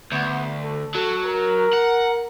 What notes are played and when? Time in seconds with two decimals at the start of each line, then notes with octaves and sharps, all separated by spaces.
0.12 D2 B3
0.63 A4
0.95 F#3 A4
1.25 A#4
1.73 F#5